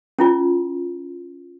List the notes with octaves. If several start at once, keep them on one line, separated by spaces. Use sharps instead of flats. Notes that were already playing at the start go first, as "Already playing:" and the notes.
C#4 E4 F4